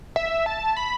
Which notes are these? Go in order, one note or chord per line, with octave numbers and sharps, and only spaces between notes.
E5
A5
B5